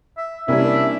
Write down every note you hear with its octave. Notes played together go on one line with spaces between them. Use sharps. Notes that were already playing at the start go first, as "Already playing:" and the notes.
E5
C3 G3 A#3 C#4 D4 E4 E5